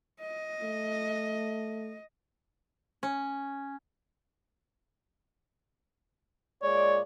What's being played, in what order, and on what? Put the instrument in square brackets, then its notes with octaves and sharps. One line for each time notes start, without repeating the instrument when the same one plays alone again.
[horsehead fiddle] D#5
[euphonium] A3
[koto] C#4
[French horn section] A#2 G#3 D5 [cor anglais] C#5